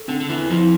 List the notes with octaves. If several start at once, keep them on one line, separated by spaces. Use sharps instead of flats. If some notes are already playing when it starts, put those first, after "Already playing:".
Already playing: A4
D3 C4
D3
E2 E3
F2 F3 E4